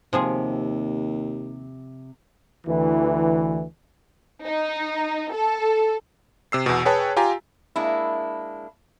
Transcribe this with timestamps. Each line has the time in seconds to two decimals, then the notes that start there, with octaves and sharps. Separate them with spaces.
0.13 D#2 C3 F3 G#3 G#4
2.67 D2 E3
4.44 D#4
5.32 A4
6.52 C3 E6 C7
6.66 E2 B2
6.85 G#4 B4 C#5 G5 A5
7.17 F4 G4 G#5 A#5
7.76 G#3 A#3 D4 E4